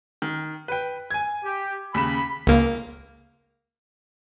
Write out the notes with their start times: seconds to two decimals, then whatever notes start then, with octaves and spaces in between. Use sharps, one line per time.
0.22 D#3
0.68 B4 G5
1.11 G#5 G#6
1.45 G4
1.94 D#2 C#3 B5 E7
2.47 C#2 A#3